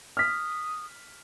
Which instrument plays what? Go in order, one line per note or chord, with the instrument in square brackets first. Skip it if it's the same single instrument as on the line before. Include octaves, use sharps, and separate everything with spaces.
[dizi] D#6 [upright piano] F6 B6